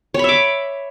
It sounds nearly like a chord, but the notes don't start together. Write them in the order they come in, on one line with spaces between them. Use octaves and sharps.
C#5 B5 E5 D6